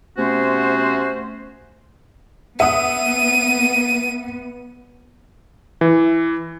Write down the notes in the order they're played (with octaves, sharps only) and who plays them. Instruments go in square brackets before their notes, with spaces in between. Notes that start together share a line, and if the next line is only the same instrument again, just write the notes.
[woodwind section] C3 A3 B3 C#4 F#4 C5
[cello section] B3 [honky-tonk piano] E5 F#5 D#6 [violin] D#7
[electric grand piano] E3